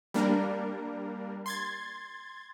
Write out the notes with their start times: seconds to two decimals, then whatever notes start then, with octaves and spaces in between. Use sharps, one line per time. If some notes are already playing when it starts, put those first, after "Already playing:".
0.14 G3 A#3 D4 A#4
1.46 C6 G#6 A6